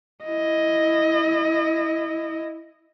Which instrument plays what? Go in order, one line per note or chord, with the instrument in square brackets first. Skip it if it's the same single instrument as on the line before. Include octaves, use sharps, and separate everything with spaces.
[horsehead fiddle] E4 D#5